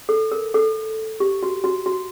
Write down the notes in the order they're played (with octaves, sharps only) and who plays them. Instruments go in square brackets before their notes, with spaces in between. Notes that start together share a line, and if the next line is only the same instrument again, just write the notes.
[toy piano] A4
A#4
A4
G4
F#4
F#4
F#4